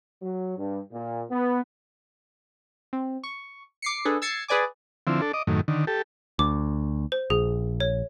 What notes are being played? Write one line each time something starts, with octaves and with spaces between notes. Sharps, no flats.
F#3
G2
A#2
B3
C4
C#6
D6 C7 C#7
D4 G#4 A4 B4
E6 G#6 A6 C7 C#7
G#4 B4 D5 G#5 D6
D3 F3 C4 E4
D4 A4
D#5 D6
F#2 A2 D#3
D3 D#3
G4 A4
D2 D6
C5
A#1 G#4
C#5